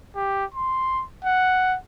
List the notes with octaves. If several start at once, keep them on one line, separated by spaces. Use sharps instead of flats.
G4
C6
F#5